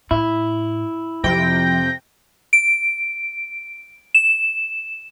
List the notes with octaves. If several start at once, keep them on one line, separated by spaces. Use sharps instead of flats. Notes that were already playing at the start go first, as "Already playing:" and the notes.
A2 E4
F2 C3 F3 G5 A#6
D7
E7